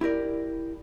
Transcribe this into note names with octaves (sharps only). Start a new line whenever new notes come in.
E4 G4 A#4 D5